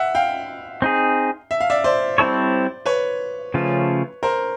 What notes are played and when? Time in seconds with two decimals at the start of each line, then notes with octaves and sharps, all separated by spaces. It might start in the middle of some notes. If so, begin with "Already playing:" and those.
Already playing: E5 F#5
0.15 F5 G5
0.82 C4 D#4 G#4
1.51 E5
1.61 F5
1.70 D5 E5
1.84 C5 D5
2.18 G3 C4 E4 A4 C#5
2.86 B4 C#5
3.54 C#3 F3 A3 C#4 F4
4.23 A#4 C5